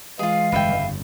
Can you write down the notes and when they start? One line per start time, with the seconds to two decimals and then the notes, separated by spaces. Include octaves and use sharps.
0.19 E3 G#3 F4 G#4 F5
0.52 G1 F2 C#3 B4 E5 G5